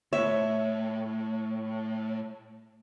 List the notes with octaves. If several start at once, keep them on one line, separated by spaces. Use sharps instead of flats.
A2 C#5 E5